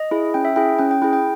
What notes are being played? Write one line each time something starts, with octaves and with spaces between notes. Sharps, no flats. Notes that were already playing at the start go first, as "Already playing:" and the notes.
Already playing: D#5
E4 G#4
C#4 G5
E5
E4 G#4 G5
C#4 G5
G5
E4 G#4 G5
G5